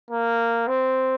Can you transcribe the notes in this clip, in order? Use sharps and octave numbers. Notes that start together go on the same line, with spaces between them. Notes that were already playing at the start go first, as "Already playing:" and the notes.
A#3
C4